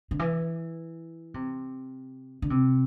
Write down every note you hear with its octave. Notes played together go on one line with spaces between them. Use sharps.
D3
E3
C3
D3
C3